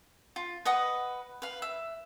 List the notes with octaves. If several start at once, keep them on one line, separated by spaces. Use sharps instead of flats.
F4
B4 D#5 F#5 D#6
B4 F5
E5